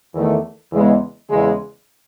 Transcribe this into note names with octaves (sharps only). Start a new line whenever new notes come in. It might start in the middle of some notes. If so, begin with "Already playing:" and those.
E2 D#3 A3
E2 C#3 G#3 B3
E2 C#3 G#3